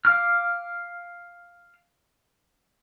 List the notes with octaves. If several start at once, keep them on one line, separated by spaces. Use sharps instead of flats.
F5 D6 F6